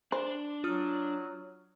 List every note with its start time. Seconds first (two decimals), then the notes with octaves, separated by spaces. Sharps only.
0.12 D4 C5 D5
0.64 F#3 F4 D#6 F6